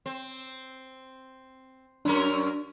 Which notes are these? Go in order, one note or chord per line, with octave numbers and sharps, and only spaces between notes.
C4
F#2 C#4 D4 A#4